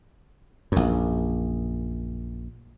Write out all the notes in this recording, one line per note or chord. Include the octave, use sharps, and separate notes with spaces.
A#1 F#2